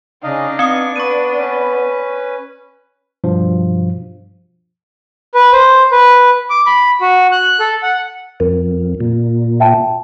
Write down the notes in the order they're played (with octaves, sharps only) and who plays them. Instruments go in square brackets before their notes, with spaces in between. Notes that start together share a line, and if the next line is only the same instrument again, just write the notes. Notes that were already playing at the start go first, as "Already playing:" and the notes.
[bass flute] C#3 [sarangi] D4 [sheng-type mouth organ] D#4 D#5 F5
[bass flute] B3 [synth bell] C4 D#6 C#7
[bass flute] B3 [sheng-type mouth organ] B4 [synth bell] C#6 D#7
[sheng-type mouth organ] C#4 B4
[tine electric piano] G2 B2 F3
[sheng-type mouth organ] B4
C5
B4
D6
B5
F#4
F#6
A4
F#5
[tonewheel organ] F2 [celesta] A#4
[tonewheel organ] A#2
[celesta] E5 G5 A5